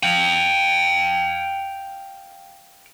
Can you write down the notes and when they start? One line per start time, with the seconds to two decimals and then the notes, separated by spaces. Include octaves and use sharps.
0.03 F5 G5